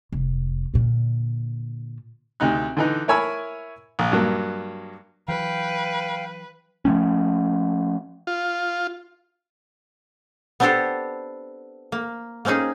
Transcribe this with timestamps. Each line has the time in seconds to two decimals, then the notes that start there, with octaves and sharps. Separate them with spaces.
0.12 F1
0.74 A#2 D3
2.40 D2 C3 D#4 F#6
2.77 D3 E3 D#4
3.08 E4 A#4 C#5 G#5 B5 E6
3.99 A#1
4.12 G2 F#3 A#3
5.28 E3 F#3 B4 F5 G5
6.85 F3 F#3 A3 C#4
8.27 F4
10.60 B3 C4 D4 G4 A4 C5
11.92 A#3
12.45 A#3 C4 C#4 D#4 G#4